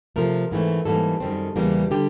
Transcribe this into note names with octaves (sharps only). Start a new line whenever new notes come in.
C3 F3 A3 A#4
G#2 E3 A3 C4
G#2 E3 G3 A#3 A4
F#2 D#3 G3 C4
E2 C#3 E3 G3 A#3
D3 G3 G4